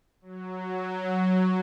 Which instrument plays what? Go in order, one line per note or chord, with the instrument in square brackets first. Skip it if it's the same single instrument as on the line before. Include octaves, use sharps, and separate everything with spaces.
[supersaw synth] F#3